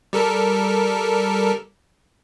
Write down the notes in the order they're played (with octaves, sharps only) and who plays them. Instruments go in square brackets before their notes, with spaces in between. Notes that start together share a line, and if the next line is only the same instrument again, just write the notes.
[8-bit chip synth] G3 A4 A#4